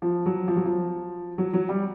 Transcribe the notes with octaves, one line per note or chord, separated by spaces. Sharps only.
F3
F#3
F3
F#3
F3
F#3
F#3
G3